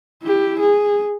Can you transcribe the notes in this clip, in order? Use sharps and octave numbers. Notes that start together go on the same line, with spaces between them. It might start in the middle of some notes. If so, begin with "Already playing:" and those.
E4 G4
G#4